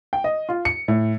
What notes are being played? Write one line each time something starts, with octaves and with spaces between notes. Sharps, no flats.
G5
D#5
F4
C#7
A2